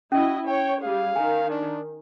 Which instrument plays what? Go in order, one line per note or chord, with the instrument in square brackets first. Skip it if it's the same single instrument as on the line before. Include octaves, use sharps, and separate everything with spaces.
[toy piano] C#4 [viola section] E4 D#5 [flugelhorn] F#4
[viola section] C#5 [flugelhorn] G5
[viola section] G3 G#4 [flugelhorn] F5
[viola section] D#3 [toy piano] G#5 A#5
[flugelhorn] D4